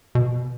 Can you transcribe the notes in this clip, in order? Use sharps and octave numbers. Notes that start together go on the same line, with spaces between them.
B2